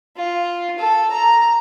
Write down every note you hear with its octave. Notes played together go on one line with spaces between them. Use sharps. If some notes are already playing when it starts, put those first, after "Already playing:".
F4
A4
A#5